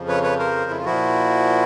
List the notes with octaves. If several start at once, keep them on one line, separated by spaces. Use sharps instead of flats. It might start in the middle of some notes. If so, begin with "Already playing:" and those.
Already playing: F2 C#3 F3
B4 C#5
B4 C#5
A#4 C5
E4
F4
A#2 F3 E4 F#4